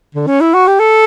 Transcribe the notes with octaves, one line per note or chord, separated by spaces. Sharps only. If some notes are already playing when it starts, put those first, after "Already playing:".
D3
C#4
E4
F#4
G4
A4